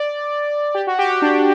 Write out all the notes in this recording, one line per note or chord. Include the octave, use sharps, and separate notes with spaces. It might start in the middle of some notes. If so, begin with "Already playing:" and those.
Already playing: D5
G4
F#4
G4
D4